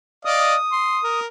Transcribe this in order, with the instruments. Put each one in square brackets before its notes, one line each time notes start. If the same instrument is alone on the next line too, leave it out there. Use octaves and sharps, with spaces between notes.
[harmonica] D5 D#5 F5 [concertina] D#6
[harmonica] C6
A#4